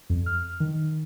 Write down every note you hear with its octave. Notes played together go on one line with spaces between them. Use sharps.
F2
F6
D#3